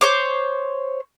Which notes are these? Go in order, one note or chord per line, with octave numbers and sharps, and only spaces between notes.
C5 C#5 D6